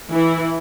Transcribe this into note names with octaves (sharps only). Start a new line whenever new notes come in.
E3 E4